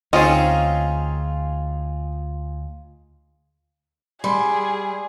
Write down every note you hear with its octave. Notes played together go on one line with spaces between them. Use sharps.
D2 C4 C#4 D#4 F4 G#4 D#5
G3 G#4 B5 C6